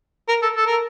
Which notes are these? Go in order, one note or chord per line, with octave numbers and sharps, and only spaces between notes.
A#4
A4
A4
A#4